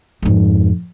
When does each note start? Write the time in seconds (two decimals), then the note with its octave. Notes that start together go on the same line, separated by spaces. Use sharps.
0.22 F2 G#2